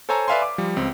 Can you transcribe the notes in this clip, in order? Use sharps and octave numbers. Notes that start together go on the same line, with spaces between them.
A4 C5 C#5 G#5 A#5 E6
B4 D5 E5 F5 G#5 C6
D6
F3 G3
C#2 C4